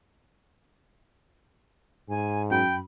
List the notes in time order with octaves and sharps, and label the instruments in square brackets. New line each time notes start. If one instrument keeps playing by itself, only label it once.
[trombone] G#2 [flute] G#5
[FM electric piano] F#2 [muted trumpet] G5 [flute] B5